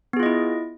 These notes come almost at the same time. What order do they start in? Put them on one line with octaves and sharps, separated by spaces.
B3 G#4 F4 D#5 E4